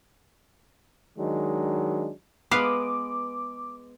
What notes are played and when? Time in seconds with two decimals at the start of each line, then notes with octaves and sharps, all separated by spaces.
1.18 D#3 F#3 G#3 D4
2.51 G#3 B3 B4 F5 D6